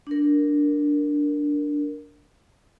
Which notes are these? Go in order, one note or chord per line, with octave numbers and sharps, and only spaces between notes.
D4 A#4